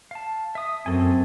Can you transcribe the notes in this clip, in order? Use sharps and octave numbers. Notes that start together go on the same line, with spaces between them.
F5 A5
E5 D#6
F#2 A#3 C4 A4 G#5